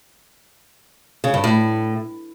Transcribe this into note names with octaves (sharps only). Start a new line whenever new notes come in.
C#3
G2
A2